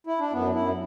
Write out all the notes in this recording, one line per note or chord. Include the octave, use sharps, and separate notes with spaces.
E4
D4
F#2 B3
F#2 E4